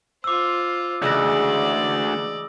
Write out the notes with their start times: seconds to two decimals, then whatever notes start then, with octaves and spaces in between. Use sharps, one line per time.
0.24 F4 C5 D6 E6
1.02 D2 C#3 E3 G#3 D5 D#6 E6 A#6